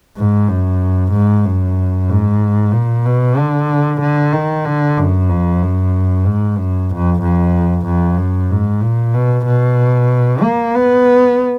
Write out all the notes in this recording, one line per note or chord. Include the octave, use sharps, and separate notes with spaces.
G#2
F#2
G#2
F#2
G#2
A#2
B2
D3
D3
D#3
D3
F#2
F2
F#2
G#2
F#2
F2
F2
F2
F#2
G#2
A#2
B2
B2
A#3
B3